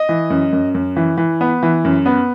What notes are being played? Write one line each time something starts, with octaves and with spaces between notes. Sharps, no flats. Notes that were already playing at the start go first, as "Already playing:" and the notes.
Already playing: D#5
E3
F#2
F#2
F#2
E3
E3
B3
E3
F#2
B3